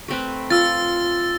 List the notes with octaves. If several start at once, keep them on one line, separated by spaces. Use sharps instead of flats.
A3 C4 B4
F4 E6 A6